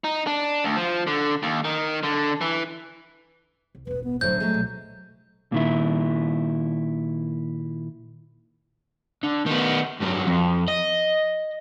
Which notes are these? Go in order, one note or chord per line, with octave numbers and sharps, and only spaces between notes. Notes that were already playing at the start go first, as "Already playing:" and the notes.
D#4
D4
D2
F3
D3
D#2
D#3
D3
E3
C2
E1 A1 B4
B3
A2 D3 F#3 C5 G6
F#3 G#3 A3
B1
A#2 D#3 E4
D3
D#3 B3
G2 F#3
F2
D#5